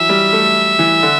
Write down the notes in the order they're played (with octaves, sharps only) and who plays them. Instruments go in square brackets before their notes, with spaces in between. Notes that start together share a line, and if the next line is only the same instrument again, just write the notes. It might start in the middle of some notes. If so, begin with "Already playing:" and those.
Already playing: [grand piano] E3 F#3 [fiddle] E5
[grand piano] G3
A3
E3
D3